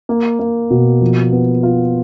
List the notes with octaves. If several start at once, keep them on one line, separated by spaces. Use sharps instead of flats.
A#3
A#3
B2
F3
B3
F4